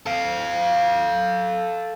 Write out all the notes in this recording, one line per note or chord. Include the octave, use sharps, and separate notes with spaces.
A4 F5